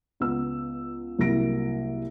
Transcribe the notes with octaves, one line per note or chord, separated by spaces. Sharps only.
C#2 B3 E6
C2 F#3 A#3 E4 A#6 D7